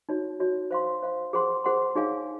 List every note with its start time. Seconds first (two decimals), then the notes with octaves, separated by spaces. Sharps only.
0.09 D#4 F#4 C#5
0.39 D#4 F#4 C#5
0.71 C5 F5 C6
1.03 C5 F5 C6
1.33 G#4 C5 F#5 C6
1.64 G#4 C5 F#5 C6
1.95 D#4 G#4 C#5 F5 G#5